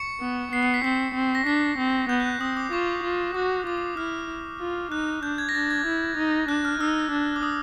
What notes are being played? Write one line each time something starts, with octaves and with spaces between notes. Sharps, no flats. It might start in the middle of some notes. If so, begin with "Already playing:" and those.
Already playing: C#6 C#7
B3
B3 C7
C7
B6
C4 B6
C4
A#6
D4 B6
C4
B3 G6
F#6
C4 D#6
D6
F4 C#6
F4
F#4 D6
F4 D6
D6
E4 F6
F4
D#4 F#6
D4 G6
G#6
A#6
D4 A6
G#6
E4
D#4
D4 F#6
F6
D#4 E6
D4
D6
D#6